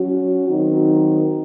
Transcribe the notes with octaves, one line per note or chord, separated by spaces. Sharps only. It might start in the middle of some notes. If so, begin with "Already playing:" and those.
Already playing: F#3 C#4 F#4
D#3 F#3 C4 D#4